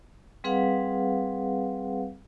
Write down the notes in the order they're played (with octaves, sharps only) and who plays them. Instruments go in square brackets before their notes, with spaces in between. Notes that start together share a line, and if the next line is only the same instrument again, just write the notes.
[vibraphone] G3 C4 G#4 B4 F5 F#5